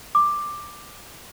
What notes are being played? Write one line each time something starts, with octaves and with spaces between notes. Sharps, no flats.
D6